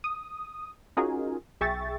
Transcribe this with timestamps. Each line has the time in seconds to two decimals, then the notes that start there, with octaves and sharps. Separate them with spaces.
0.04 D#6
0.97 C#4 D#4 F4 F#4 G#4 A#4
1.61 B1 G#4 E5 G5 C#6 A6